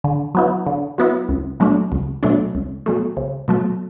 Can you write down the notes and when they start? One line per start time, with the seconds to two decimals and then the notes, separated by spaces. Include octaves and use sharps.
0.04 D3
0.35 F#3 B3 E4
0.67 D3
0.98 F#3 B3 E4
1.29 C#2
1.60 B2 F#3 A3 D4
1.92 C#2
2.23 B2 F#3 A3 D4
2.55 C#2
2.86 B2 F#3 A3
3.17 C#2
3.48 B2 F#3 A3